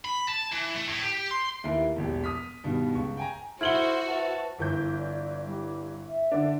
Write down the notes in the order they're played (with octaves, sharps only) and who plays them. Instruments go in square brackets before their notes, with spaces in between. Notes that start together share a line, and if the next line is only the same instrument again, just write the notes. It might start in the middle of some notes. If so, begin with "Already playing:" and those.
[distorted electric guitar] B5
A5
E3
A3
A2
G4
C6
[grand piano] D#2 E3 E4 G4 A#4 C7
E1 A#1 G4
D#6 F6 B6
G2 B2 D#3
C#2 C#6
G5 G#5 A#5
[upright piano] E4 F#7 G7 [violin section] F#4 [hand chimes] A4 F6 G#6 [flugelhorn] C5
[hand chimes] B4 C5 E5 [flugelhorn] A5
[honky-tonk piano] G1 E3 G6
[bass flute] D5
G3
E5
[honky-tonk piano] D3 D4